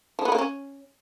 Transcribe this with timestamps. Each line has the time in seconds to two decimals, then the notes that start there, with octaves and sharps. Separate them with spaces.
0.19 F3
0.25 B3
0.32 A#3
0.38 C#4